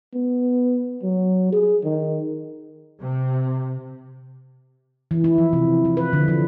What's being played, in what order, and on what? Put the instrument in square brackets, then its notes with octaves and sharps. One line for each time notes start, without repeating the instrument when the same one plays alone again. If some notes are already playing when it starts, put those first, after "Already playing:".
[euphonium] B3
F#3
G#4
D#3
[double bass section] C3
[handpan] E3
E4
F3
C3
F3
B4
D3
F3